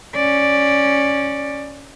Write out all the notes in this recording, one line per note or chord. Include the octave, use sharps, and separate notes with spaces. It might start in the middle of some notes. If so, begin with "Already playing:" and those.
C#4 D5